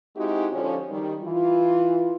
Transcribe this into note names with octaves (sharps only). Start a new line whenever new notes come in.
G#3 C4 D#4 E4 F#4 G4
D3 F3 C#4
D#3 G3
E3 F4